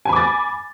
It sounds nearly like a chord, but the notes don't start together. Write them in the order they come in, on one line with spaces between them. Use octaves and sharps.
G#5 B5 D6 A6